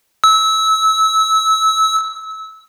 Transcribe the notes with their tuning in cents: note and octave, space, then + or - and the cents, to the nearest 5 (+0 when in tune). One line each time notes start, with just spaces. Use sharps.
E6 -25